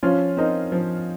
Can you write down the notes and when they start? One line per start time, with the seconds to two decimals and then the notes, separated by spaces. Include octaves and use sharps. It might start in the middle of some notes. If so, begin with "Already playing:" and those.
0.03 F3 C#4 F4
0.37 C4 D#4 A#4 D#5
0.72 F3